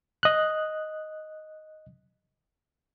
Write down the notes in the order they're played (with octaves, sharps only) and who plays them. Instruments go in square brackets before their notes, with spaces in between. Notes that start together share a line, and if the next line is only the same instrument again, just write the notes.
[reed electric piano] D#5 F#6